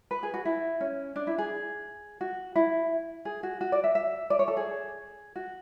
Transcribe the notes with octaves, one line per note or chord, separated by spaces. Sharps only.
B4
G#4
F#4
E4
C#4
D4
E4
G#4
F#4
E4
G#4
F#4
F#4
D5
E5
E5
D5
C#5
A4
G#4
F#4